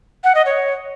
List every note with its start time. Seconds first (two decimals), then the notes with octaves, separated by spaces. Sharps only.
0.24 F#5
0.35 D#5
0.46 C#5